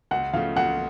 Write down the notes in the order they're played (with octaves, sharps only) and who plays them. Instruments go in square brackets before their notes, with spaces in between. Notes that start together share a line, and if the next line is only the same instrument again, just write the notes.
[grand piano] C#2 [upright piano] F#5
[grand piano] C#3 F3 A3 [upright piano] F5
[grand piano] C#2 [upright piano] F#5